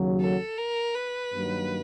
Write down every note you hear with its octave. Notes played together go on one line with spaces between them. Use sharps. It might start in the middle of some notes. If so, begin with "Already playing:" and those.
Already playing: D#2 C#3 F#3
A4
A#4
B4
G2 D#3 F#3 A#3